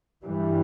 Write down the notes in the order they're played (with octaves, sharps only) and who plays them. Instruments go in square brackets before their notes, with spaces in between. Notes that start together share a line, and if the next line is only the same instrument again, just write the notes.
[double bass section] G2 E3 G3